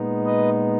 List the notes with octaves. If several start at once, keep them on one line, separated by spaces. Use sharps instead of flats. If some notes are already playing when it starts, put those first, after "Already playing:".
Already playing: A#2 G#3 B3 D#4
B4 D#5